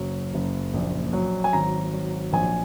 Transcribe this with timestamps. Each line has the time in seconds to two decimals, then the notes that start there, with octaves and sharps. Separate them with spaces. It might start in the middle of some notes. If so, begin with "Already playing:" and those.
Already playing: F#1 F#3
0.34 F#1
0.74 A#1
1.13 F#3
1.44 G#5
1.53 G#1 A#5
1.93 F#3
2.32 A#1 G#5